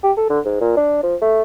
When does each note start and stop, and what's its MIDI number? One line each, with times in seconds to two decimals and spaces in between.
0.03 0.12 67
0.17 0.26 69
0.30 0.39 50
0.45 0.59 44
0.60 0.72 46
0.77 1.01 62
1.03 1.15 53
1.21 1.42 57